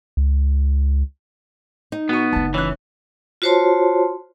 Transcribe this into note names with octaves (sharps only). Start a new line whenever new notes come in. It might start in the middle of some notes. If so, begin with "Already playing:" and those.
C#2
D#4
B2 B3 C#6
F#1 A3 A5
E3 C#4 F#6
F4 F#4 C5 C#5 A5 C6